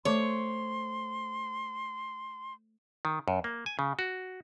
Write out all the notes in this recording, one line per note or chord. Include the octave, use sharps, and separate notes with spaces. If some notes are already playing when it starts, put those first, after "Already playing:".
A3 C5 C#5 C6 D6
D#3
F#2
A#3
G#5
C#3
F#4